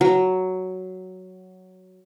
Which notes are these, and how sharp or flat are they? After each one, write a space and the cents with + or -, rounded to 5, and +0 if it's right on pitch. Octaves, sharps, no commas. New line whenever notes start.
F#3 +5